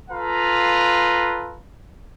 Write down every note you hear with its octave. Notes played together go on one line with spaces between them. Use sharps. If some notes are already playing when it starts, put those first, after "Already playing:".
F4 A4 B4 F5 A#5